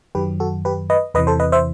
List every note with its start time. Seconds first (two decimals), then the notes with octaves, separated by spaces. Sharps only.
0.15 F#2 D#3 F#3 G4 B4
0.40 F#4 A4
0.65 G4 B4
0.90 B4 D#5
1.14 E2 C3 E3 B4 D#5
1.27 A4 C5
1.40 B4 D#5
1.52 C5 E5